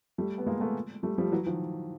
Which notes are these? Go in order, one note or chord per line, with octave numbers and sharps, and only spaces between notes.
G3 A3
B3
G#3 A#3
A3 B3
G3 A3
F3 G3
E3 F#3
D#3 F3